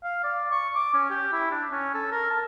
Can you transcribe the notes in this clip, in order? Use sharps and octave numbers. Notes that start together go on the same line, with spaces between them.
F5
D5
C#6
D6
C#4
G4
E4
D4
C#4
A4
A#4
A5